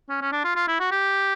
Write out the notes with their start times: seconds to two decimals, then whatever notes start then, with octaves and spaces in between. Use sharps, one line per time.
0.09 C#4
0.21 C#4
0.32 D4
0.44 F4
0.55 F4
0.68 E4
0.80 F#4
0.91 G4